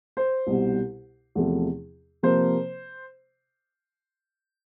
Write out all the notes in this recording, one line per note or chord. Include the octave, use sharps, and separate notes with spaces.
C5
C2 B2 G3
E2 C3 F3 A3
C3 F3 A#3 C5